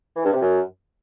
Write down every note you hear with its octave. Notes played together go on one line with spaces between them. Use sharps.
E3
G2
C3
F#2